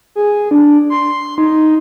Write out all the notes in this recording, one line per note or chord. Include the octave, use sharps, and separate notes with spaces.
G#4
D4
C6
D#4